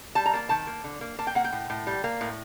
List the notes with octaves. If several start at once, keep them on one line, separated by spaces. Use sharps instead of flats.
G3 A5
A#5
A#3 A5
D#3 A5
A#3
D3
A#3
A#3 A5
G5
A#3 F#5
G5
A2
A2
G3
A#3
A2